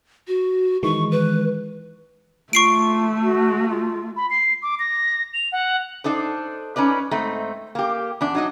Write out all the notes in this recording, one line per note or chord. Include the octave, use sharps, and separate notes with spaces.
F#4
D#3 E3 G#3 C#6
B4
A3 F4 C#6 C7 D7
F#4
F4
B5
C7
D6
A#6
F7
F#5
D4 D#4 A4 C5
C#4 D#4 B4 D5
G#2 A3 C4 D#4
A#3 G4
E2 D4
F#3 D#4 D#5